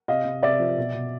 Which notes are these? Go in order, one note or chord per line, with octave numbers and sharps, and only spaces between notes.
C3 D#5 F5
C3
C3 D5 E5
F3
B2
B2